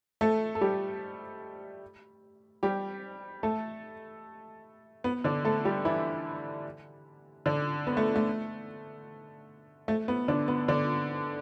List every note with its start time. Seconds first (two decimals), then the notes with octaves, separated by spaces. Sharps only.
0.21 A3 A4
0.55 A4
0.61 G3 G4
2.63 G3 G4
3.43 A3 A4
5.04 B3
5.24 D3 D4
5.45 A3 A4
5.65 G3 G4
5.85 E3 E4
7.46 D3 D4
7.87 B3
7.97 A3
8.16 A3
9.88 A3
10.08 B3
10.28 D3 D4
10.48 B3
10.68 D3 D4